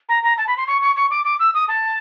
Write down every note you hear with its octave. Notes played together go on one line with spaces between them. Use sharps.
A#5
A#5
A5
B5
C6
C#6
C#6
C#6
D6
D6
E6
D#6
A5